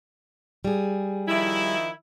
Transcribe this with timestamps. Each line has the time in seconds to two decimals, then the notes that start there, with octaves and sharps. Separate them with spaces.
0.65 G3 G#4
1.28 D#3 F3 E4